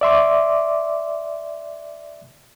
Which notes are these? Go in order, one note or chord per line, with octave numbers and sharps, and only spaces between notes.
D5 E5 C6 D6